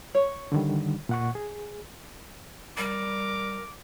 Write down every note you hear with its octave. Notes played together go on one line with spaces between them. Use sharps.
C#5
D3 D#3 G3
A#2 F#5 C#6
G#4
G3 A#4 D6